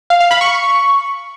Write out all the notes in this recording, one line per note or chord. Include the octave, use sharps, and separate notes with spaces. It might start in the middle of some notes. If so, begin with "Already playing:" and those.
F5
F5
B5
C#6